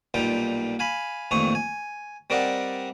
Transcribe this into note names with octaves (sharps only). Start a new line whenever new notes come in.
B1 A#2 G3 D#4 F4 G5
F5 G#5 B5
A1 F2 A#2 D#3 C#6 D#6
G#5
G3 C4 A#4 D5 D#5 F#5